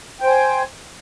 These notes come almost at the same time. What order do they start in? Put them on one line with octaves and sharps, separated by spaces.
G5 C5 G#5